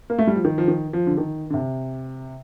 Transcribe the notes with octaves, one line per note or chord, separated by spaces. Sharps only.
A#3
A3
G3
F3
D#3
F3
D#3
F3
D3
D#3
D3
C3